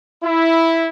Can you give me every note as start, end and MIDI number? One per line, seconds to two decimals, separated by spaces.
0.23 0.88 64